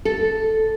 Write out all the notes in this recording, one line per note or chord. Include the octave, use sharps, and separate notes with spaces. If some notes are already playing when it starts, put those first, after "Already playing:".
A4